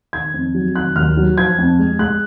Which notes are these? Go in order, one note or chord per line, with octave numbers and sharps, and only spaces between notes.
D#3 G#6
F2
F#3
D#3 F#6
D#2 F6
F#3
F3 G#6
F2
G#3
G#3 F#6